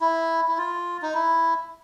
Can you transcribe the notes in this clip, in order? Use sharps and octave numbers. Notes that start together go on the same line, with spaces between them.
E4
E4
F4
D#4
E4